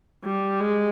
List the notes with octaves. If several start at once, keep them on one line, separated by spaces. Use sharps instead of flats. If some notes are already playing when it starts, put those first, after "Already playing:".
G3
G#3